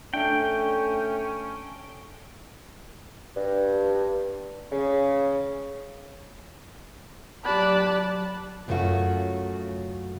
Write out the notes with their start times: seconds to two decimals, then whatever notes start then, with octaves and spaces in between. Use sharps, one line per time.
0.14 A3 C#4 D4 E5 G5
3.36 G2
4.71 C#3
7.44 F#3 G4 D5 A5 B5 F#6
8.68 F#2 C#3 A3 F4 F#4